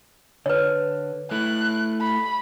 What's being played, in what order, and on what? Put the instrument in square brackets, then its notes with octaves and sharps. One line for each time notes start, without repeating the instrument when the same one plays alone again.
[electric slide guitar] D3 [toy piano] B4 C#5
[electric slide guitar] A3 E4 [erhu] F#6
[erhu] B5